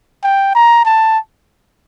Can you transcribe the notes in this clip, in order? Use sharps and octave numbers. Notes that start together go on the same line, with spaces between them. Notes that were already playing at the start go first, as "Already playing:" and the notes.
G5
A#5
A5